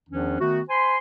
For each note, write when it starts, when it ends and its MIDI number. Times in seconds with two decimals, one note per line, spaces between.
0.10 0.38 40
0.10 0.38 51
0.10 0.38 53
0.10 0.38 61
0.10 0.38 62
0.40 0.61 51
0.40 0.61 57
0.40 0.61 59
0.40 0.61 66
0.70 0.98 72
0.70 0.98 80
0.70 0.98 83
0.70 0.98 84